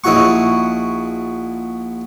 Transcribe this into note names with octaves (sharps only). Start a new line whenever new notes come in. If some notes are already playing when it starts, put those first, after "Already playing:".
A#1 D#4 E4 F#4 F#5 C#6